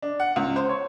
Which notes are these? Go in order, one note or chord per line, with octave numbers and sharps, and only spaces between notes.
D4
F#5
C#2
C5
C#5